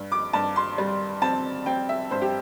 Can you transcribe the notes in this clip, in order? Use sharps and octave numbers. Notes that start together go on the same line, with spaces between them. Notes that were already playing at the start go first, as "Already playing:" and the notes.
Already playing: G2
D6
G2 A5
C6
G3
C4 A5
C4 G5
E5
G2 C5
G4